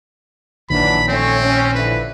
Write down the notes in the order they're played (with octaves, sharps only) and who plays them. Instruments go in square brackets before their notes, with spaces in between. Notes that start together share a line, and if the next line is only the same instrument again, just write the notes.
[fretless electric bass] A#1 A#2 D#3 [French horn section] E3 F#3 D4 [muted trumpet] B5
[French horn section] A3 C#4 C#5 [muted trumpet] C4
[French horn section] C#4
[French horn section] D3 F3 E4 [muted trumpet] B4